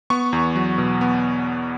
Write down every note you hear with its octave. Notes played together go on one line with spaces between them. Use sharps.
B3 C#6
E2
F#3
B2
B3